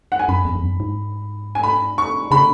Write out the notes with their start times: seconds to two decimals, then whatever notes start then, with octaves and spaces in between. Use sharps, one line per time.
0.12 F#5
0.19 G#5
0.29 F#2 B5
0.45 E2
0.55 E2
0.63 F#2
0.80 G#2
1.55 G#5
1.63 B5
1.98 C#6
2.31 C#3 B5